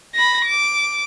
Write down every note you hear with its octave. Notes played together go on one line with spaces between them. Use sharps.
B5 A#6
D6